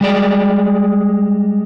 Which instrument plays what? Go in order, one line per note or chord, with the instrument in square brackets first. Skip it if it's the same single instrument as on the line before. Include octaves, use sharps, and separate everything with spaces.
[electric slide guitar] G3 G#3 D5